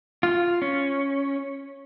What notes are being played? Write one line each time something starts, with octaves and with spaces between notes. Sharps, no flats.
F4
C#4